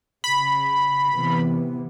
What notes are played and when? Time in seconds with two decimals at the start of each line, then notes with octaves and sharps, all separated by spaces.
0.24 C#3 B5
1.13 C3 E3 B3